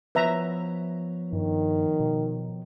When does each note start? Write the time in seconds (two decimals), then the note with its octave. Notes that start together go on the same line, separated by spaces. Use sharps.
0.15 F3 B3 B4 C#5 E5 A#5
1.33 G2 D#3
2.00 B2